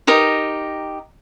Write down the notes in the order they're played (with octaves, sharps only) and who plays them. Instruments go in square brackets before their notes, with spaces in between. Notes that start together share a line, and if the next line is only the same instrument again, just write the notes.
[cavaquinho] D#4 G4 A#4 D#5